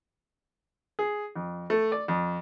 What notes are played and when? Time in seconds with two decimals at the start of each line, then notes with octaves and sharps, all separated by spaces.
0.99 G#4
1.36 F2
1.70 A3
1.92 D5
2.08 F2